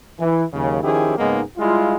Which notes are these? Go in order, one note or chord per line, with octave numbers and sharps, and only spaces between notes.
E3
D#2 C#3 F#3
D#3 F3 C#4 E4 G4 G#4
G#2 C#3 G#3 A#3 B3 D#4
G3 G#3 E4 F4